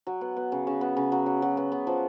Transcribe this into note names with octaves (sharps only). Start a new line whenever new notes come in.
F#3
B3
B3
C#3
C#3
B3
C#3
F#3
F#3
F#3
B3
B3
F3